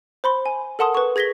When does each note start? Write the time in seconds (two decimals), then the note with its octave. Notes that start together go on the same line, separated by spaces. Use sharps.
0.24 C5 B5 C6
0.46 G#5
0.79 A4 A#4 F#5 A5 C6 D#6
0.94 B4 C#6
1.16 G#4 G#6 A#6 B6 G7